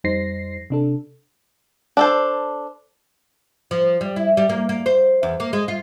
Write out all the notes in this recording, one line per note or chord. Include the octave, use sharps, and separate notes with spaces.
F2 G3 D#4 C5 A#6 C7
C3 D4 A4
D4 A4 C5
F3
G3
E4
G3
A#3
A#3
C5
E2
A#3
G#3
F4